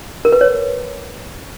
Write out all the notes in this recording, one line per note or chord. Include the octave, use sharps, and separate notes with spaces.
A#4
B4
C#5